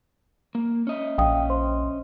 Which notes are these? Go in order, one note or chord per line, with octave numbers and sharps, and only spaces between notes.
A#3
C#4 D#5 E5
A#1 F5 G5 D#6
C5 C6